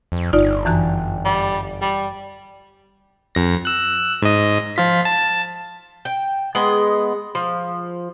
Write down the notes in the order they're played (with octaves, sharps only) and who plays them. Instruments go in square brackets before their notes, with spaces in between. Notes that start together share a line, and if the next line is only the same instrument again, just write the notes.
[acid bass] F2
[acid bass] G1 [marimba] D#4 F4 D5
[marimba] F#2 E3 F#6
[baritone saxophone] G3
G3
[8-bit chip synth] F2 A#6
E6 F#6
G#2 D#5
F3 F4 B6
A5
[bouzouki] G5
G#3 B3 D#5
F3